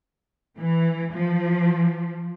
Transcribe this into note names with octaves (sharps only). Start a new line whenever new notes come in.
E3
F3